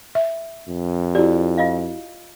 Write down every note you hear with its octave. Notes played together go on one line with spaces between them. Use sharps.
E5
F2
E4 F#4 G4 D5
F4 D#5 F5